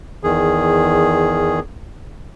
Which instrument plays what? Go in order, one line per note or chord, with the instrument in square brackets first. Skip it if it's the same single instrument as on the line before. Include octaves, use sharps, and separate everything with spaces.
[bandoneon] E2 D#3 G#4